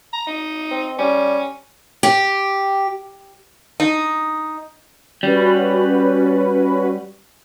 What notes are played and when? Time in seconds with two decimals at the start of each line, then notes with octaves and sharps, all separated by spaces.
0.13 A#5
0.27 D#4
0.71 C4
0.99 G3 C#4
2.03 G4
3.80 D#4
5.23 G3 C#4 F#4 B4